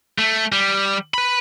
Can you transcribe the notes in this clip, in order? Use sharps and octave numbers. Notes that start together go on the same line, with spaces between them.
A3
G3
B4 B5